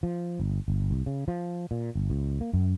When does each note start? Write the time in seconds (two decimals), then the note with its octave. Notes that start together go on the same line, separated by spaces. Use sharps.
0.03 F3
0.40 G1
0.68 G1
0.91 C2
1.06 C#3
1.28 F3
1.71 A#2
1.95 G1
2.10 C#2
2.41 A#3
2.53 F#2